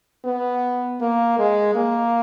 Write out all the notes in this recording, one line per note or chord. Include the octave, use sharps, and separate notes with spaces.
B3
A#3
G#3
A#3